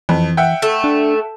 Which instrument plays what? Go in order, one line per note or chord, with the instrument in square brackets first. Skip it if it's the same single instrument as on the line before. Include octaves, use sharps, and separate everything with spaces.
[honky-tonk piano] F2 [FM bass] E3
[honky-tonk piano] E5 F#5 G5
[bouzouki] A3
[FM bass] D4